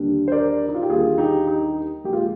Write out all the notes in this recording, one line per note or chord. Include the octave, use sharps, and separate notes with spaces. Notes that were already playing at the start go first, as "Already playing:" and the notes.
Already playing: D#2 D3 G3 D4
C5
A#4 D5
D#4
F4
G4
D#2 D3 G3 F4 G#4
D#4 G4
D#4
A#1 A#2 G#3 G4
F4